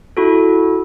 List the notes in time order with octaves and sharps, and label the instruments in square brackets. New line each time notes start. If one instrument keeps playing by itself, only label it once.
[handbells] E4 F#4 A4